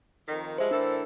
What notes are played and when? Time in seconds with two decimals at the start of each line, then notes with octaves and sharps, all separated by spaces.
0.28 F2 D#3
0.58 F3 G3 G#3 C5 E5
0.71 A2 E3 D4 A4 A#4